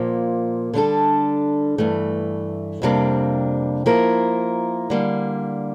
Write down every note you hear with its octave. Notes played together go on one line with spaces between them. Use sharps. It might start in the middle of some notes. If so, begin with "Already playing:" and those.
Already playing: A#2 F3 A#3
D3 G3 D4 A4
G2 E3 A3
F2 C3 G3 A#3 D4
F3 A#3 E4 A#4
D3 G3 A#3